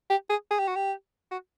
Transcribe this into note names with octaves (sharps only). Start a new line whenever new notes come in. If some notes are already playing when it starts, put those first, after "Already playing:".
G4
G#4
G#4
G4
F#4
G4
F#4